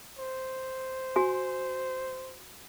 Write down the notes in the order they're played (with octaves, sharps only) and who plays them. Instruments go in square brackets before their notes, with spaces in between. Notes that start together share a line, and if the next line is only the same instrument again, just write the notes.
[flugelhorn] C5
[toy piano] F#4 G#5